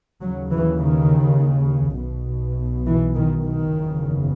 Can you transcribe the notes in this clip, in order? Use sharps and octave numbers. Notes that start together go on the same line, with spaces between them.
D#2 C#3 F#3
E3
D#3
B1 B2
E3
D#3
D#3
F#1 E2 C#3